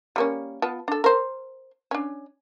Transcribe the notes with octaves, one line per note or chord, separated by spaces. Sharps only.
G3 A#3 C#4
B3 F4 A5
D4 A4
A#4 C5
C#4 D4